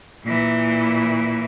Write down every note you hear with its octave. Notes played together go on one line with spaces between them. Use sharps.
A#2 E3